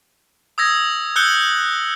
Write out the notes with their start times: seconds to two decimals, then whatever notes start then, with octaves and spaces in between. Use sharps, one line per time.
0.58 D#6 E6 G#6 A#6
1.16 E6 F#6 G6 C#7 G7